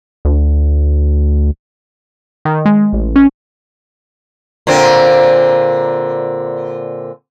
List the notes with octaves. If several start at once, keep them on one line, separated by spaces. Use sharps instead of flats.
D2
D#3
G#3
A1
C#4
A#2 D3 C4